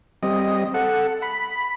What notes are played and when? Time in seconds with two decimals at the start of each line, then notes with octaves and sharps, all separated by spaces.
0.23 G3 C4 D#5
0.74 A4 F#5
1.22 B5